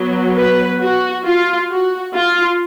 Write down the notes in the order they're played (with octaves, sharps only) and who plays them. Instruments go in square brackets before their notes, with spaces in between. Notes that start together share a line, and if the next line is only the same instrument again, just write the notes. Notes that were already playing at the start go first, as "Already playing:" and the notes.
Already playing: [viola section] F#3 B3
B4
F#4
F4
F#4
F4